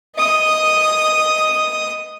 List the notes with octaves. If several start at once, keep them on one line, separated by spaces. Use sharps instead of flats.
D#5 D#6